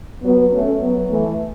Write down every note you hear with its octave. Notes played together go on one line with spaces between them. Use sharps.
F#3 B3
A3 C#4
F#3 B3
E3 A3